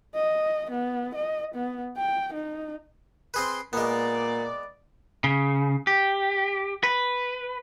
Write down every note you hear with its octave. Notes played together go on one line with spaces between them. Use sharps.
D#5
B3
D#5
B3
G5
D#4
C4 G#4 B4 C6
A#2 G#3 B3 D5
C#3
G4
B4